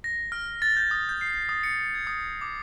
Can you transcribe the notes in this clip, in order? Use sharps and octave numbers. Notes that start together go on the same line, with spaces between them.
A#6
F6
A6
G6
D#6
G6
C7
D#6
C#7
G#6
D#6
D6